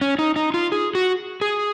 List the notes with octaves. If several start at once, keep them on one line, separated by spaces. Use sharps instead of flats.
C#4
D#4
D#4
F4
G#4
F#4
G#4